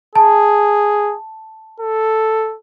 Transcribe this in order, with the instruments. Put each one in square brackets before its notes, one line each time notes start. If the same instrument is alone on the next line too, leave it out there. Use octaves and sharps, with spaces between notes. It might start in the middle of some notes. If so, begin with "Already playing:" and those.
[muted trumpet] G#4 [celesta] A5
[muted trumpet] A4